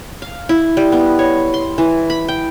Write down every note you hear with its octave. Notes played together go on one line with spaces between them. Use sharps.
F5
E4
G3
B3
C#5
C6
E3
B5
G5